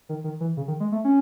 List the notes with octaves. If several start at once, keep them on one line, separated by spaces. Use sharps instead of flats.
D#3
D#3
E3
C#3
D#3
G#3
A3
C#4